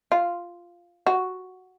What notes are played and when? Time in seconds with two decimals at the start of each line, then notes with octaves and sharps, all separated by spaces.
0.12 F4
1.06 F#4